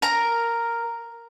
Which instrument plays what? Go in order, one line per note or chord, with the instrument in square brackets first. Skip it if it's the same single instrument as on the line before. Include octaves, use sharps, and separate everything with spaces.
[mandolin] A#4 A#5